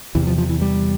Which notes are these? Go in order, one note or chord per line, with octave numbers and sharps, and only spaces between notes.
E2 C3 E3
F3
F3
E3
G3